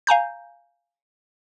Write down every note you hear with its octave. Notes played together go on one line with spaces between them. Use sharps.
F5 G#5 A#5 G6